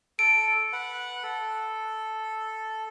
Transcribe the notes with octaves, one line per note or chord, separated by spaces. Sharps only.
A4 D7
B4 F#5
A4